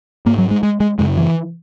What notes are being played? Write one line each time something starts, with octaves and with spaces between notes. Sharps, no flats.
G#2 A#3
F#3
G#3
G#3
G#3
F#2 C#3 G#3
E3